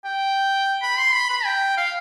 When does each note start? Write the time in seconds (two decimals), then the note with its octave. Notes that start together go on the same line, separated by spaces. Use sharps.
0.04 G5
0.82 B5
0.99 C6
1.14 B5
1.30 B5
1.45 G5
1.77 F5